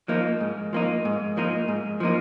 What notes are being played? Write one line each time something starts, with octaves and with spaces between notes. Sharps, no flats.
F3 A#3 D#4
G#2
F3 A#3 D#4
G#2
F3 A#3 D#4
G#2
F3 A#3 D#4